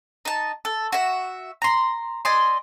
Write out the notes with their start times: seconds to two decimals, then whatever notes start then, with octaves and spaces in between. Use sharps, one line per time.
0.25 D#4 A5
0.65 A4
0.92 F#4 E5
1.62 A#5 C6
2.25 D5 D#5 G#5 C6